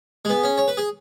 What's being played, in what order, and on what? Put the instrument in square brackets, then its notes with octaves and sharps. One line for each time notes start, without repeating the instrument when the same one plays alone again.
[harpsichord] G#3
[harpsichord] B3 [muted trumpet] G#4
[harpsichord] C#4
C#5
B4
G#4